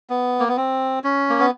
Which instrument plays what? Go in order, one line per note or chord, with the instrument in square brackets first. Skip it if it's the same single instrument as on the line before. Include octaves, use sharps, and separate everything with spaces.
[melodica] B3
A#3
B3
C4
C#4
A#3
B3